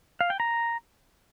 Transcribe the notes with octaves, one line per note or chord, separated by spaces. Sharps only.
F5
G5
A#5